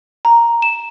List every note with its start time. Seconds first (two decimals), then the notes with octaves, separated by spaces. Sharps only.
0.25 A#5
0.62 E7